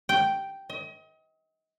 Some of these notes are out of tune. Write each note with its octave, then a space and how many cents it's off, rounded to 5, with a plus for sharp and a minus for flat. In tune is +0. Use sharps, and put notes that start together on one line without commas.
G5 -5
D#5 +35